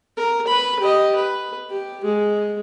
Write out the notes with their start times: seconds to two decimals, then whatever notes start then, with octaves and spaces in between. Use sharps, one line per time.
0.17 A#4
0.47 B4 B5
0.80 G4 D#5
1.15 B4
1.70 G4
2.04 G#3